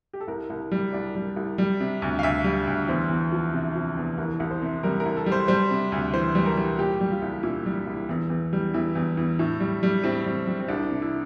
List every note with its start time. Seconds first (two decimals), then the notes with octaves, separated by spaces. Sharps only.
0.13 G4
0.20 A4
0.28 C2 A#4
0.50 C2
0.72 G3
0.93 C2 D5
1.15 G3
1.37 C2
1.58 G3
1.80 C3
2.02 D2
2.19 F5
2.23 D2 E5
2.44 G3
2.67 D2
2.88 E2 C5
3.09 E2
3.32 F3
3.53 C3
3.75 F3
3.97 E2
4.18 C2 A#4
4.40 C2
4.51 C5
4.62 C3
4.83 G3 A#4
5.00 A#4
5.06 C2
5.17 A4
5.26 G3
5.32 C5
5.48 G3 C5
5.71 C3
5.92 D2
6.14 E3 C5
6.35 G3
6.46 A#4
6.57 G3
6.78 A#2 G4
7.00 G3
7.11 F4
7.22 C2
7.43 A#2 E4
7.66 G3
7.87 C2
8.09 E2
8.30 E2
8.53 G3
8.74 E2 E4
8.95 E2
9.17 E2
9.39 A2
9.60 G3
9.83 G3
10.04 A2 C4
10.25 G3
10.47 G3
10.60 C4
10.68 C2 D4
10.91 C3
11.02 E4